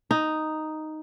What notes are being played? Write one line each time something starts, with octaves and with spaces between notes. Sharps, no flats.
D#4